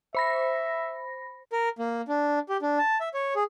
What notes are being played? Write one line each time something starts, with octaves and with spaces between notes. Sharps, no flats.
C5 E5 B5 A#6
A#4
A#3
D4
G4
D4
A5
E5
C#5
G#4